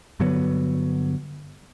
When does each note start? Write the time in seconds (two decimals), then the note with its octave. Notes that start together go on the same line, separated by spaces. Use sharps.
0.20 G2 D3 F#3 B3